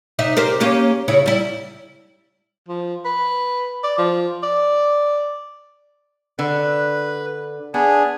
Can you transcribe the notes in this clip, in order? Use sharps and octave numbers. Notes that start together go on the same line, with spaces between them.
C3 D#4 E5
G4 A#4 C5
A#3 C#4 G4
C#3 E4 C#5
G3 E4
F3
B4
D5
F3
D5
D3 B4
B3 D4 G#4